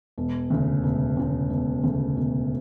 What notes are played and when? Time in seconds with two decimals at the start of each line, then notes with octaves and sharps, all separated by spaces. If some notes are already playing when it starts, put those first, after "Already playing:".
0.18 E1
0.50 D2 C#3
0.84 E1
1.17 D2 C#3
1.50 E1
1.83 D2 C#3
2.17 E1